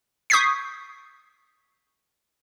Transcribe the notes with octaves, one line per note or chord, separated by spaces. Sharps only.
C#6 D#6 G6 G#6 B6 C7